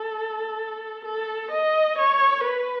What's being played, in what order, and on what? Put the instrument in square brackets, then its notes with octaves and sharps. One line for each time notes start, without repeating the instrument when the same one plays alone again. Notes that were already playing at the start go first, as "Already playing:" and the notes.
Already playing: [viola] A4
A4
D#5
C#5
B4